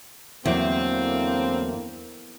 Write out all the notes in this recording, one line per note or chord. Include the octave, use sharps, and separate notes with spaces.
E2 A2 D3 E3 F#3 A#3 C4 E4